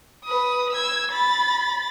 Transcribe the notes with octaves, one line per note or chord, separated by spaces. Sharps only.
B4 D#6
E6 G#6
B5 A6